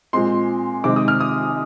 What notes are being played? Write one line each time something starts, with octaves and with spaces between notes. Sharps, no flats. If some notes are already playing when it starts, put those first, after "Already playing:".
A#2 G#3 C4 C6
C3 D#3 G#3 C4 D6
D#6
F6
D#6